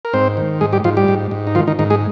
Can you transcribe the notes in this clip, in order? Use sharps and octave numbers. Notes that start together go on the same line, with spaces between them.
A#4
G#2 C4 C5
D#3
G#2 G#3 G#4
G3 G4
G#2 F3 F4
G3 G4
G#2
G#2
D#4
D#3 F3 F4
D#3 D#4
G#2 D#3 D#4
G#3 G#4